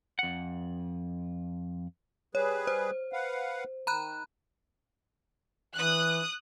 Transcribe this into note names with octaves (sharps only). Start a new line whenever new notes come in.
F2 F#5
G3 G#4 B4 C#5
C5
B4 F5 F#5
D#3 A#5 B5 F#6
E3 D#6 F#6